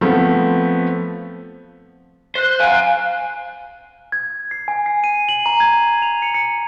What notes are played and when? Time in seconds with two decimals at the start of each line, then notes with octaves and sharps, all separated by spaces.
0.01 F3 A3 B3 C4
2.35 C5 F#6
2.60 F5 F#5 G#5
4.12 G#6
4.51 C7
4.68 G#5
4.86 C7
5.04 D#7
5.29 F#7
5.46 A#5
5.60 G#6
6.02 F7
6.22 C#7
6.34 C#7